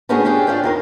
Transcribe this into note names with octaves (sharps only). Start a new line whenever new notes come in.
A3 B3 C#4 D4 F#4 G#4
C#4 D4 G4 G#4
D4 F4 C#5 D5 G5
E2 D#4 A#4